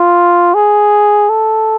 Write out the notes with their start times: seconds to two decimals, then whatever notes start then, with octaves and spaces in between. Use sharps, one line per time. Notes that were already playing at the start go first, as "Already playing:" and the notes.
Already playing: F4
0.54 G#4
1.29 A4